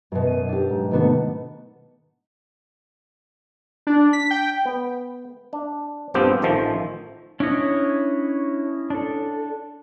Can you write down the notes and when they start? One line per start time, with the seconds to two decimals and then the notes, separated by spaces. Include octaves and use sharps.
0.12 F#2 B2
0.27 D#7
0.49 D4 G4
0.70 G#2
0.91 C3 D#3 A3 B3 D4 F#4
3.87 D4
4.13 B6
4.31 G5
4.65 B3
5.53 D4
6.14 A#1 G2 F3 B3 C4 G4
6.42 A1 D#3 F3 A3 C5
7.40 C#4 D4 E4 C#5 D#5
8.90 D4 A4